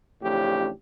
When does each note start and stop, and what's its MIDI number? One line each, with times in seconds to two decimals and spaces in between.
0.22 0.68 33
0.22 0.68 41
0.22 0.68 45
0.22 0.68 49
0.22 0.68 62
0.22 0.68 67